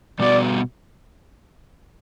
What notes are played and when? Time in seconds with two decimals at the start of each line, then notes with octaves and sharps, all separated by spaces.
0.19 B2 G3 B3 F#4 D5